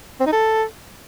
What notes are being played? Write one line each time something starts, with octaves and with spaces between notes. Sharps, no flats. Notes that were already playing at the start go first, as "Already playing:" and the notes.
C4
D#4
A4